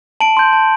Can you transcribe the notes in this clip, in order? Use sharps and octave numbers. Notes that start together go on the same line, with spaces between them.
A5 D7 F#7
C6 G6
A5